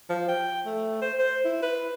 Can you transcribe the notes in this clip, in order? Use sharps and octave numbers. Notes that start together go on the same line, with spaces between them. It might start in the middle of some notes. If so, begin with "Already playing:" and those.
F3
G5
A3
C5
C5
E4
B4